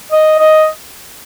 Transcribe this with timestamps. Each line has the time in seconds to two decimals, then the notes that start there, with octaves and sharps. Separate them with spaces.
0.12 D#5
0.39 D#5